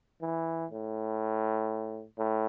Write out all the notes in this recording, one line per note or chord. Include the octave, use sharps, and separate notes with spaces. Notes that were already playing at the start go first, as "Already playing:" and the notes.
E3
A2
A2